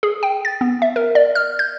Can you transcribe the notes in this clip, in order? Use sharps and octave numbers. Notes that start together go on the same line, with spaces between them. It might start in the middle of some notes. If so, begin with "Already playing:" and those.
G#4
G5
A6
B3
E5
A#4
D5
F6
G6